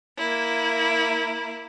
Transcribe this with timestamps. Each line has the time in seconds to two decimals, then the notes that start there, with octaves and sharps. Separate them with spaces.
0.18 A#3 E4